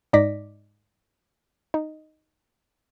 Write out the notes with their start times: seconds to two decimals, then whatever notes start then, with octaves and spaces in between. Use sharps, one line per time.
0.13 G#2 D#4 D5 A#6 B6
1.74 D#4